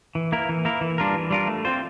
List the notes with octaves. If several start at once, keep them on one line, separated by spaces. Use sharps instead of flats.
E3
A#3 E4 A#4
E3
A#3 E4 A#4
E3
G3 D4 F4 A#4
E3
G3 D4 F4 A#4
A3
C4 F4 C5